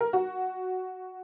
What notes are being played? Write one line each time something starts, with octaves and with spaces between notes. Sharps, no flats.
A#4
F#4